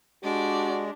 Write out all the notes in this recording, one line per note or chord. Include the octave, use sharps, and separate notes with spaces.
G#3 D4 F#4 G4 D5